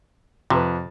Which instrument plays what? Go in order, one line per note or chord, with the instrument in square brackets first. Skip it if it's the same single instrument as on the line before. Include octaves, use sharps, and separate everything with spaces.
[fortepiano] F2 B4 [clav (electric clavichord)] C3